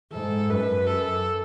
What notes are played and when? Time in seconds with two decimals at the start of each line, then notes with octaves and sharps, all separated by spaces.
0.12 G#2 A4
0.49 F#2 B4
0.87 F#2 A4